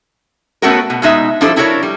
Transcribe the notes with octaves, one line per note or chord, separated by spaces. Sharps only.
A3 B3 C#4 F#4 A4 A#4
B2
B2 G#3 D#4 E5
F3 G3 D4 E4 A4 C5
D4 E4 F#4 A4 A#4 C#5
G3